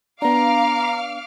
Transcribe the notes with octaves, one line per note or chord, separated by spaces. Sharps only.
B3 D4 F5 A#5 D6 F6